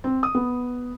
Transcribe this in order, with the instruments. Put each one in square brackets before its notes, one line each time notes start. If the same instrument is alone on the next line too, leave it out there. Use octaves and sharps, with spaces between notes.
[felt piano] C4
D#6
B3